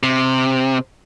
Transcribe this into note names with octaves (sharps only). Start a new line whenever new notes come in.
C3